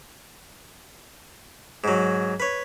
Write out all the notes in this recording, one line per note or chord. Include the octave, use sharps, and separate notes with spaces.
G#2 F#3
B4 C#5